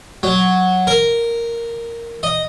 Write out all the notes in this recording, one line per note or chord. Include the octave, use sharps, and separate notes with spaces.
F#3
A#4
D#5